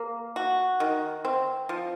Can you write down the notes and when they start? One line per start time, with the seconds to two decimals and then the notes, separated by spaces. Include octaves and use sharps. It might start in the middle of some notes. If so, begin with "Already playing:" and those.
Already playing: A#3
0.36 F#4
0.80 D#3
1.25 C4
1.69 F3